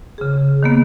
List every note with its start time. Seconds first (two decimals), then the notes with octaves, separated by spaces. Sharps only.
0.18 C#3 G#4
0.63 D#3 A#3 B3